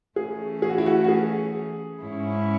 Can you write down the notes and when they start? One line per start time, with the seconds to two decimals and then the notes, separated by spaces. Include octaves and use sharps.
0.16 E3 A3 C#4 G#4
0.62 G#4
0.69 F#4
0.78 E4
0.86 F#4
1.04 F#4
1.08 G#4
2.01 G#2 G#3 C#4 E4